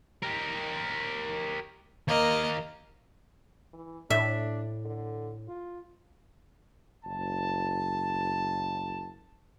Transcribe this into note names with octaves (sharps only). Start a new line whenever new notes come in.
G4 A#4
D#2 A#3 D#5 F5
E3
A2 D4 E5
D3
F4
F#1 A5